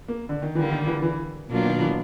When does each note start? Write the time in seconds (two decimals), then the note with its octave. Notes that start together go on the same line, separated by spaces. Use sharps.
0.08 A#3
0.29 D3
0.42 D#3
0.55 D3 E3 G3 A#3
0.71 D#3
0.87 E3
1.02 E3
1.50 B2 F#3 A#3 D4 F4
1.65 D#3
1.80 E3